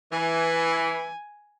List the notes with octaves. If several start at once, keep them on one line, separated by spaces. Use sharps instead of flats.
E3 G#5